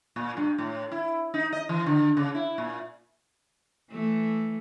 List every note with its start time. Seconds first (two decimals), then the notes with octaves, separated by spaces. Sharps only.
0.16 A#2
0.37 G2
0.58 A2
0.92 E4
1.34 D#4
1.52 D#5
1.69 E3
1.86 D3
2.17 C#3
2.35 E4
2.58 A#2
3.92 E3 A3